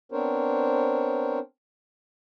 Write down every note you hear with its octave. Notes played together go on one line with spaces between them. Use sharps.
B3 C4 D4 A#4 C5 C#5